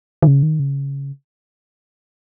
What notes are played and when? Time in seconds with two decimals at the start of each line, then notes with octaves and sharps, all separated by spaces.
0.22 D#3
0.27 C#3
0.43 D#3
0.59 C#3